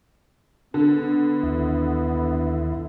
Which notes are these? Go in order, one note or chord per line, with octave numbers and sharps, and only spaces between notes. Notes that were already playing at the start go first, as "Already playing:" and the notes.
D3 B3
D#2 E4